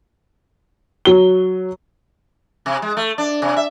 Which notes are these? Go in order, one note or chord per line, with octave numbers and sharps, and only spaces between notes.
F#3 G7
C3
G#3
A3
D4
C3
E5